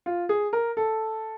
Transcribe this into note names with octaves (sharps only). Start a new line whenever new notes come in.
F4
G#4
A#4
A4